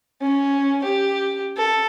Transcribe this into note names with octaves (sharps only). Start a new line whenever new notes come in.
C#4
G4
A4